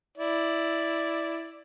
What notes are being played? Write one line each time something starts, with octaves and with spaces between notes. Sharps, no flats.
E4 D5